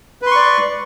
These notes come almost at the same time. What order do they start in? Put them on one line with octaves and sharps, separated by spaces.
B4 C6 C#6 D5